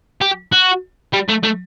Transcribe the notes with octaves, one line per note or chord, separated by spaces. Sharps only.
G4
F#4
G3
A3
A3